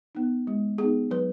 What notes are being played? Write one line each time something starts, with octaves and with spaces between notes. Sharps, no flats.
B3 D#4
G#3
B3 D#4 G#4
F#3 B4